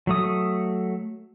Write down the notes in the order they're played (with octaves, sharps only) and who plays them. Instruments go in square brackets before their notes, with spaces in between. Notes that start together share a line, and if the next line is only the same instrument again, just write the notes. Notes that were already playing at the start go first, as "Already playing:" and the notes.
[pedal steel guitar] F#3 A3 D#6